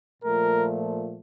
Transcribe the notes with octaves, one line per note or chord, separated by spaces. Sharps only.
A#2 F3 A3 A#4